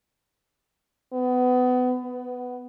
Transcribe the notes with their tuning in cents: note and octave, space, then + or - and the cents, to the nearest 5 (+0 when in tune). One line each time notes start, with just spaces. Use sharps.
B3 +25
B3 +10